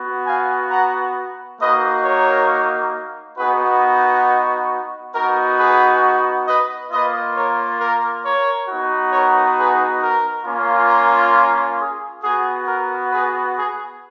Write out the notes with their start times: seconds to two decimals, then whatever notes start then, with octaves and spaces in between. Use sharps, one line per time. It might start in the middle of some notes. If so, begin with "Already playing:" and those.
Already playing: B3 F#4
0.26 F5 G#5
0.71 F#5 A#5
1.59 A#3 D#4 F#4 B4 D#5
2.04 A#4 C#5
3.37 B3 D#4 F#4 G#4 B4
3.82 A#4
5.14 B3 D#4 F#4 A#4
5.58 G#4 B4
6.47 B4 D#5
6.91 A#3 F4 B4 D#5
7.35 A#4 C#5
7.80 A#4
8.24 A#4 C#5
8.68 B3 D#4 F#4
9.12 A#4 C#5
9.57 G#4 B4
10.02 A#4
10.45 A#3 C#4 F4
10.89 A#4
11.33 A#4
11.79 G#4
12.23 B3 F#4 G#4
12.68 A#4
13.11 G#4 B4
13.56 G#4